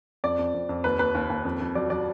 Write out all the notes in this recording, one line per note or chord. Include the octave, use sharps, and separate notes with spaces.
F2 D5
F2
F2
F2
D#2 B4
D#2 B4
D#2
D#2
F2
F2
F#3 D5
F#3 D5